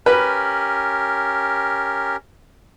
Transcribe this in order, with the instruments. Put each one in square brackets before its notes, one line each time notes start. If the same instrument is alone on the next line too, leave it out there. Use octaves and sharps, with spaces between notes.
[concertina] C#4 G4 A#4 [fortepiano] B4